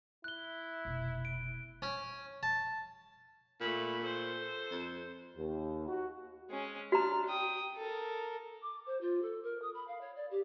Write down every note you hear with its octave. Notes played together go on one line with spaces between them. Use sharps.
E4 F#6 G7
F1 B2
D7
C#4
A5
A#2 A3 B5
A4 C5
F2
D#2
F#4
G#3 C#4
D4 F#4 A#5 F6
G5 D#6
A4 A#4
D6
C5
F4
A4
A#4
D#6
B5
F5
C#5
D5
G4